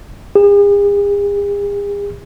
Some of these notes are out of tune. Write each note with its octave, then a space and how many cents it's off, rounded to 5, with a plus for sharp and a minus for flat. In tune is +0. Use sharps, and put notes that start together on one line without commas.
G#4 -45